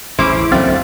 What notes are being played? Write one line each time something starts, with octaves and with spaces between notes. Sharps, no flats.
A1 D#2 C#4 E4 G#4 C5 D6
A#1 F#2 D3 A3 C4 F5 A6